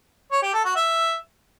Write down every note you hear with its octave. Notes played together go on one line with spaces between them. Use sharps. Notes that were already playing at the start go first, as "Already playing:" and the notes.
C#5
G4
A4
F#4
E5